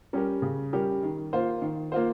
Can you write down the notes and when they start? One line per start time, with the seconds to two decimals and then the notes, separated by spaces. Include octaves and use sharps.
0.13 G3 C#4 G4 A#4
0.42 C#3
0.73 G3 C#4 G4 A#4
1.03 D#3
1.33 A#3 F4 C5
1.62 D#3
1.92 A#3 F4 C5